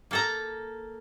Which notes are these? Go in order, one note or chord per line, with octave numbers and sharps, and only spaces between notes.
A#3 A4 A#5